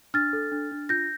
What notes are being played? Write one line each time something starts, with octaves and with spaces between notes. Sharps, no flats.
D4 F6 A6
A4
D4
D4
F4 G6 A#6